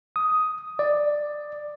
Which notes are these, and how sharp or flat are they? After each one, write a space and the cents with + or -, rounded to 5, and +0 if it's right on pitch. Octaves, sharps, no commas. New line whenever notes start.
D#6 +10
D5 +10